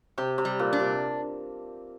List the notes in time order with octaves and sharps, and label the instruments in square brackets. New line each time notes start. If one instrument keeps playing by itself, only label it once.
[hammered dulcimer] C3 [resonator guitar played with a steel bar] G4
[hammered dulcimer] C3
[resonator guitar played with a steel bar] G3
[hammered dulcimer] A#2
[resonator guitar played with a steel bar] D4
[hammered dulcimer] C3